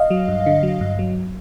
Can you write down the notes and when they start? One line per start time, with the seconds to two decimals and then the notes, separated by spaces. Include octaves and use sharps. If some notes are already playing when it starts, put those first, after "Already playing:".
Already playing: D#5 F5
0.10 F#3
0.28 G2
0.46 D3
0.63 F#3
0.81 G2
0.99 F#3